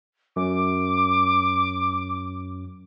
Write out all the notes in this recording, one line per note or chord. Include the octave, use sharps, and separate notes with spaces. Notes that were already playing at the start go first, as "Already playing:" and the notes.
F#2 D6